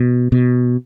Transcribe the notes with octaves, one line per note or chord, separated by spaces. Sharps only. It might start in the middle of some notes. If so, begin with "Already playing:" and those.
Already playing: B2
B2